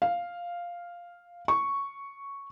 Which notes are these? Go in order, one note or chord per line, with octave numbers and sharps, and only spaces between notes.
F5
C#6